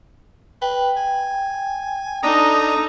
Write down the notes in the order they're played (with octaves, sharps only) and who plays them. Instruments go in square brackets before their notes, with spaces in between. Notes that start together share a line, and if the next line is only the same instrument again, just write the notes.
[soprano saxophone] B4 [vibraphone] G5
[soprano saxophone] G#5
[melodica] D4 D#6 [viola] D#4 A4 [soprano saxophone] A#5